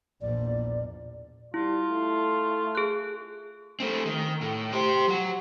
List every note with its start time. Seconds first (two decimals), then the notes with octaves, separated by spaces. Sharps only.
0.22 A#1 E2 A#2 D5
1.54 G3 E4 F4
1.90 A3
2.75 G#4 F#6
3.80 A3 C4
4.06 D#3
4.41 A2
4.73 G4 C5
5.08 F#3 F#5